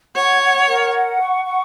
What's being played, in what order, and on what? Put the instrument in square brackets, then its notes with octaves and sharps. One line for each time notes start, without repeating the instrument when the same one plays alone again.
[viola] C#5 [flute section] F#5
[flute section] F#5
A#4
F#5
C#6
F#5